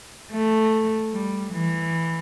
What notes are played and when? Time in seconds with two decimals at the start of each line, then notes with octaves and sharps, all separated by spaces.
0.31 A3
1.12 G3
1.53 E3